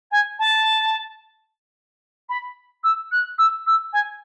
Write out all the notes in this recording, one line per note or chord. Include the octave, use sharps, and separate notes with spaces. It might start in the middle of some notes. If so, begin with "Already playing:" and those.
G#5
A5
B5
E6
F#6
E6
E6
G#5